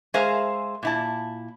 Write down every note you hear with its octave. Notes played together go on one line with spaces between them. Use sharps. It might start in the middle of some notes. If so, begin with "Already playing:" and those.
G#3 G#4 A#4 C5 E5 F5
A#2 E4 A5